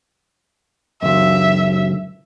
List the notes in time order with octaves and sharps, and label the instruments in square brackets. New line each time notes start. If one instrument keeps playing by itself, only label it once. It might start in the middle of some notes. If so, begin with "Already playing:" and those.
[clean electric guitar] C#2 F#2 [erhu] E5